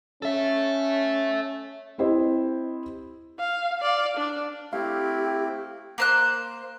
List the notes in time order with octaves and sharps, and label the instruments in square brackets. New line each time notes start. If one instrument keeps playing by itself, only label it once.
[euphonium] C#4 [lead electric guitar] A4 E5
[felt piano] C4 E4 G4 C5 D#5
[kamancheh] F5
D5 F5
D4
[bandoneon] A3 C4 E4 [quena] G4 [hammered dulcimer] F5
[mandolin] A#3 C5 F#6